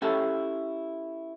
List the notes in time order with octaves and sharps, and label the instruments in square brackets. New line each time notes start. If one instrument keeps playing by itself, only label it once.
[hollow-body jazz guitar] C#4 E4 G4 A4 E5